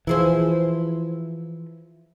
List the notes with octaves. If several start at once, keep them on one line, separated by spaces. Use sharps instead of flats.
E3 F3 E4 G#4 C5